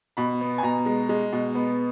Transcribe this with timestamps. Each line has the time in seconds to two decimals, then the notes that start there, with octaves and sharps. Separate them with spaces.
0.17 B2 B5
0.41 B3
0.58 G#5
0.63 B2 A#5
0.86 G#3
1.09 G#3
1.33 B2
1.55 B3